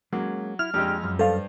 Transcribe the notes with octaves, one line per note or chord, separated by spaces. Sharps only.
F#3 G#3 A#3 C#4
E4 F6
F2 G#3 D4 G4
F#2
G2 A4 C5 F5